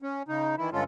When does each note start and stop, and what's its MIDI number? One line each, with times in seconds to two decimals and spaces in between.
0.02 0.23 61
0.28 0.55 49
0.28 0.55 63
0.58 0.70 51
0.58 0.70 52
0.58 0.70 64
0.72 0.84 43
0.72 0.84 50
0.72 0.84 56
0.72 0.84 61
0.72 0.84 65
0.72 0.84 69